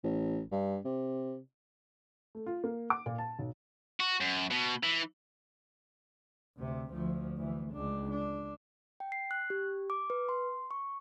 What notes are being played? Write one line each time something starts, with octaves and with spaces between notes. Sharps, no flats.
A1
G2
C3
A3
F4
A#3
D6
A#2
A5
B1
F#4
F#2
B2
E3
D2 C3
D2 F3
D2 E3
C#2 D4
D4
G5
C7
F#6
G4
D6
B4
C6
C#6